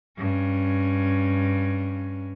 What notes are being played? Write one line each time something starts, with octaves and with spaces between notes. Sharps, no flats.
G2 C#4